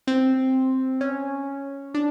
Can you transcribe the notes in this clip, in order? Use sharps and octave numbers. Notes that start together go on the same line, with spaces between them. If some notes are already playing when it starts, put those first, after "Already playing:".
C4
C#4
D4